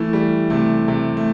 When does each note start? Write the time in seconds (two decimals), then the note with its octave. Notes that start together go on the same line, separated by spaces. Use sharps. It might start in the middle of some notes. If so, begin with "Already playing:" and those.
Already playing: E3 A3
0.13 G3
0.50 C3 A3
0.88 C3
1.17 A3